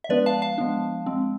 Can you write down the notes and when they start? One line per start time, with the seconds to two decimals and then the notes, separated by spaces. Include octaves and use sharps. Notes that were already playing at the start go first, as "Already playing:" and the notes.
0.04 E5
0.09 F3 G#3 B3 D4 B4 D5
0.26 F5 A5
0.42 F5 A5
0.58 F3 G#3 B3 D4
1.06 G#3 C4